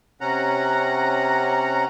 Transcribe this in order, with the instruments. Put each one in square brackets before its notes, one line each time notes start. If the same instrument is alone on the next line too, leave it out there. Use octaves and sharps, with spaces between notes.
[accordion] C3 C#4 F#5 A#5